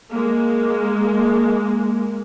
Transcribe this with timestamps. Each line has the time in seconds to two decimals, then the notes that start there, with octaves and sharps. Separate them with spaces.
0.11 G#3 A#3